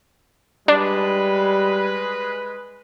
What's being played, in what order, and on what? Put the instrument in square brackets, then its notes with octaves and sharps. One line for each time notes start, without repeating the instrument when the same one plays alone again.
[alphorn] G3 [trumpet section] G#3 B4 [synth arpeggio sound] D4